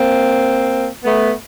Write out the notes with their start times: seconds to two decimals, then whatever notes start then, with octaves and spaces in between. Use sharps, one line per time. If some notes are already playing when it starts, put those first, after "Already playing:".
Already playing: A#3 C4
1.04 A3 B3